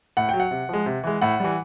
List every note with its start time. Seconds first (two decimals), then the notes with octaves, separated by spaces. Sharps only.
0.17 A2 F#5
0.29 F#3 G5
0.40 F#5
0.51 C3
0.69 F3 G#3
0.86 C3
1.04 E3 G#3
1.21 A2 F#5
1.40 E3 G3